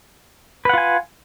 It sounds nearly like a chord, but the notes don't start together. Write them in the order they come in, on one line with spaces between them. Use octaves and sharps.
B4 F#5 F4 G#5